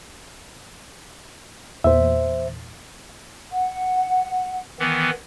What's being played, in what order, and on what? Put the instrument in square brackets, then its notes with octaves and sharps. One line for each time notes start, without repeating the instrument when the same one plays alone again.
[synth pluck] E2 A#2 [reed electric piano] C5 E5
[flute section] F#5
[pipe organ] D#3 E3 B3